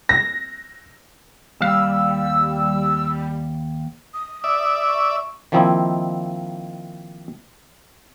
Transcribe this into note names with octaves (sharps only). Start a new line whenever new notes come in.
A#6
D#2 G3 F5 E6
D#6
D5 E5
C#6
D#3 F3 A#3 C4 D#4 E4